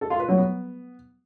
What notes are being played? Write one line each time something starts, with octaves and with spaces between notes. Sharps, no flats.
A4
F4
B4
F#3
B3